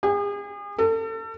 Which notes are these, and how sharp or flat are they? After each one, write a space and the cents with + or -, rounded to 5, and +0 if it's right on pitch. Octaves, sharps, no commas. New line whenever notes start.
G#4 -40
A4 +35